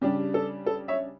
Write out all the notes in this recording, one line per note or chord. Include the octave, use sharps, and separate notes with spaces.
C#3 G3 D4 G4
A4
A4
C#5 E5